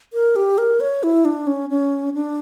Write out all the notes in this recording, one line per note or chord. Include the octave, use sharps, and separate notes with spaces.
A#4
G4
A#4
C#5
E4
D4
C#4
C#4
D4